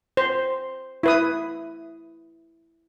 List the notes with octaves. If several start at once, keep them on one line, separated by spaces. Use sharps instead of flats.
C5
E4 B4 D#6